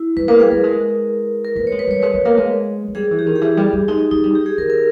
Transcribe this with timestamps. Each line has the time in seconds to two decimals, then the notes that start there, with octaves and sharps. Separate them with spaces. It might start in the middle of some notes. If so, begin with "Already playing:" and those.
Already playing: E4
0.17 G3 B4
0.28 A#3 B4
0.39 G3 G#4
0.51 G3 A#4
0.64 G#3
1.45 A#4
1.56 A#3 B4
1.67 C#5
1.72 G#3
1.79 B4
1.87 G3 C#5
2.02 G#3 B4
2.14 G#3
2.25 A#3 A#4
2.37 G#3
2.88 G#3
2.95 G3 G#4
3.11 E3
3.19 G4
3.26 D#3
3.36 G#4
3.41 E3 G4
3.57 G3
3.73 G3
3.88 G#3 D#4
4.11 G#3 D#4
4.24 G3
4.35 G4
4.46 G#4
4.58 D#3 A#4
4.70 A#4